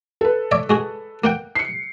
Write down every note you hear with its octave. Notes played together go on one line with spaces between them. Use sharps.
A4 B4
C#5 D5 E5
G#3 F#4 G#4
A#3 F#5 G5
C7 C#7